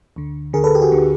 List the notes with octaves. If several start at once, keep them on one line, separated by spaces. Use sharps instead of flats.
D2 D3
D3 G#4 A#4
D2
A4 B4
G4
F#4 G#4
D2 D3